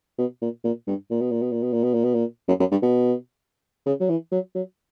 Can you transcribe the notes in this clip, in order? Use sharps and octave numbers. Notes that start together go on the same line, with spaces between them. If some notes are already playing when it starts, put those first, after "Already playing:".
B2
A#2
A#2
G2
A#2
B2
A#2
B2
A#2
B2
A#2
B2
A#2
B2
A#2
F#2
F#2
G2
B2
C#3
F#3
E3
F#3
F#3